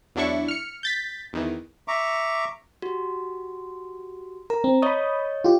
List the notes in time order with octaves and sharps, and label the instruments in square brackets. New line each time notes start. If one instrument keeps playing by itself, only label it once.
[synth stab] E2 F#3 D4 E4 C#6
F6 C#7
G6 A6 B6
E2 D#3 E3
[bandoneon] E5 A#5 C#6 D6
[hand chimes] F#4 G4
[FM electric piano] A#4 [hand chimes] A#5
[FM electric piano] C4
[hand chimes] C#5 D#5 C#6 [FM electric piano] B5 D#6
[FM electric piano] F4 G4